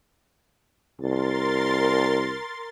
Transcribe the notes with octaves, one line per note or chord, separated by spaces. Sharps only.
C2 A#4 C6 A6